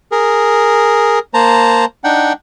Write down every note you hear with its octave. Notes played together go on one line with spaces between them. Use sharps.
G#4 A#4
A#3 C5 A5 A#5
D4 D#4 F#5 G5